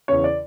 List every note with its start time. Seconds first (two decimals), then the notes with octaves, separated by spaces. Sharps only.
0.08 E2 C#3 C#5
0.24 D5